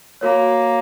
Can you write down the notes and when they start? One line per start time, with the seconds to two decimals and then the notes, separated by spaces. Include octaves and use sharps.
0.21 A#3 F#4 A#4 C#5